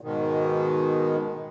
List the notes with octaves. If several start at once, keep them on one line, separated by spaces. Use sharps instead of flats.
G#2 B2 D#3